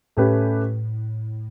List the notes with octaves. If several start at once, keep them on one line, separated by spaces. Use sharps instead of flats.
A2 A3 C#4 G4 B4